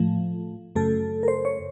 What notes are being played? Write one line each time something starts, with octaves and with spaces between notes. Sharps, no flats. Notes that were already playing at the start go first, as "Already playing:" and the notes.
Already playing: A2 F3 A3
F#2 C#3 A3 A4
A#4
C5
C#5